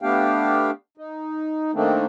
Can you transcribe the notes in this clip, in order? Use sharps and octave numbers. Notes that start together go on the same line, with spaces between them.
A3 B3 D4 G4 F5 G5
D#4
D#3 A3 A#3 C4 D4 D#4